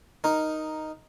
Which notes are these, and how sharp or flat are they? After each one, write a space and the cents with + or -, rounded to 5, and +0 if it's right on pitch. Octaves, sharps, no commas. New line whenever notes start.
D#4 +0 A#4 +0